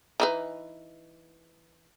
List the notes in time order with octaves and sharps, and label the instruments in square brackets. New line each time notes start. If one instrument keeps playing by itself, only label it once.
[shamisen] E3 D#4 B4